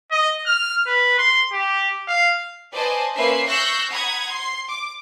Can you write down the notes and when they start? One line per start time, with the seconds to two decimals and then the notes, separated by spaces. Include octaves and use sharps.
0.11 D#5
0.46 F6
0.87 B4
1.18 C6
1.53 G4
2.08 F5
2.74 B4 C5 D5 D#5 G#5 A5
3.16 A#3 C#4 B4 C5 E5 C7
3.48 C#6 E6 F#6 G6 A#6 C7
3.91 F#5 A#5 B5 D#6 G#6
4.30 C6
4.69 D6